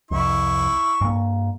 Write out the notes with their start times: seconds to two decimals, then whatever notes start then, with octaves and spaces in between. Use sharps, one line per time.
0.11 C2 F2 E4 C#6
1.01 G2 A#3